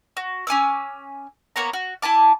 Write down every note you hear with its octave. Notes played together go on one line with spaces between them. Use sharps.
F#4
C#4 G#5 D6 E6
A#3 B3 C#5 A#5
F#4
E4 G#5 A5 D6